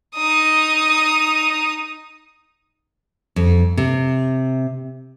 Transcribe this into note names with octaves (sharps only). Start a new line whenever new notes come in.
D#4 D#6
F2
C3